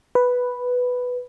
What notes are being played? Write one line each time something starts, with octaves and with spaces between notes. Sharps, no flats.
B4